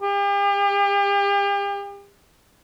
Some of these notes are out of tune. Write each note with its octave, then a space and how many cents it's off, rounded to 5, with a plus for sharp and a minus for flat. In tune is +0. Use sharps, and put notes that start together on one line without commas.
G4 +40